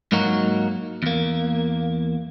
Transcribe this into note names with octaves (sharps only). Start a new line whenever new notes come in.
G#2 F#3 A#3 D#4 F#4
E2 A#3